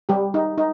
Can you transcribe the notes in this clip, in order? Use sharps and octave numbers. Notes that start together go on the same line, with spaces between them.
G3 G4
D#4
D#4